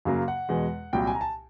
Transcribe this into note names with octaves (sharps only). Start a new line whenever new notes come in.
F#2 C#3 F#3 A#3 F5
F#5
E2 B2 G#3
C2 A#2 F#3 G5
G#5
A#5
A5